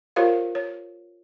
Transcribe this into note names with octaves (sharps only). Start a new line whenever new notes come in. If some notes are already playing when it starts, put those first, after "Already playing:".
F4 G4 A#4 C5 C#5 F5
C#5